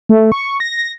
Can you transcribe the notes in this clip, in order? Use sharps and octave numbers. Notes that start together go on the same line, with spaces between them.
A3
C#6
A#6